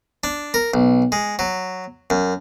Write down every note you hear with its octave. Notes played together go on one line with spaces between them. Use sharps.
D4
A#4
B1
G#3
F#3
F#2